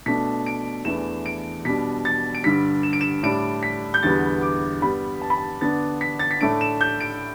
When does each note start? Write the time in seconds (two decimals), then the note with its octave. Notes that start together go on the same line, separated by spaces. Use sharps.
0.06 B2 A3 D4 B6
0.46 D7
0.85 E2 E3 A3 D4 E7
1.26 D7
1.65 B2 G3 D4 B6
2.05 A6
2.35 D7
2.44 G2 D3 G3 B6
2.83 E7
2.93 D7
3.01 E7
3.23 A2 G3 D4 D7
3.63 B6
3.94 G6
4.03 E2 D3 G3 B3 A6
4.42 D6
4.82 G2 G3 B3 B5
5.22 A5
5.30 B5
5.38 A5
5.61 D3 B3 D4 A6
6.01 B6
6.19 A6
6.31 B6
6.41 A2 A3 D4 D7
6.61 E7
6.81 G6
7.01 D7